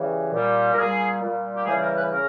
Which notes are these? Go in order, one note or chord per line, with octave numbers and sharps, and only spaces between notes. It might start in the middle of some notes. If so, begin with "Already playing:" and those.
Already playing: C#3 E3 G3
A#2 G3
A#4
A#2 G3 G#4
A#2 G3
G4
C#3 E3 G3 G#4
A#4
B4
C#3 A#4